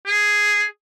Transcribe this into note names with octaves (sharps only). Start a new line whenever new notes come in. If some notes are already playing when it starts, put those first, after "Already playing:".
G#4